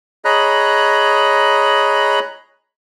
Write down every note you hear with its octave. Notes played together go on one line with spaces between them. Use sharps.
G#4 C#5 D#5 A#5 B5 F#6